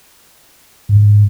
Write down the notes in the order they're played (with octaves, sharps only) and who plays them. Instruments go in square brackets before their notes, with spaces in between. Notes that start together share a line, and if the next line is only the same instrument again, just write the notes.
[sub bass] G#2